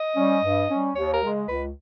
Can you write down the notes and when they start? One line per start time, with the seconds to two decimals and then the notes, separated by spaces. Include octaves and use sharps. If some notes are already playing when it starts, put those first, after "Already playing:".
Already playing: D#5
0.16 G3 C#4
0.43 G2
0.69 G3 C#4
0.95 D#2 C#5
1.13 A#4
1.22 C#3 G#3
1.48 C#2 B4